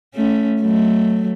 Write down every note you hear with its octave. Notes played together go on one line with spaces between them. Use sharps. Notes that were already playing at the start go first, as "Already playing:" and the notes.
A3 C#4
F#3 A3